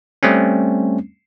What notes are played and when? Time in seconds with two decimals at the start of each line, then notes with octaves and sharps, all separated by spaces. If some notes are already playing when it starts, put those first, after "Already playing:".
0.23 G3 A3 C4 C#4